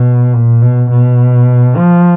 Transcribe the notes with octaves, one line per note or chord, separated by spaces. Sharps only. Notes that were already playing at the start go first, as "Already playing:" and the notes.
Already playing: B2
A#2
B2
B2
F3